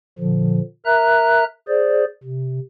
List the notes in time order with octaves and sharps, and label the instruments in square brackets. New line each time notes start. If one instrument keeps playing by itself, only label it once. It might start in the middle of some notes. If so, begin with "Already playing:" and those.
[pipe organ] A#2 D3 F3
A#4 E5 A#5 F#6
G#4 C5 D5
C3